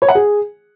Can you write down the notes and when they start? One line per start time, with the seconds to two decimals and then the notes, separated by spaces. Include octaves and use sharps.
0.02 C#5
0.08 F#5
0.15 G#4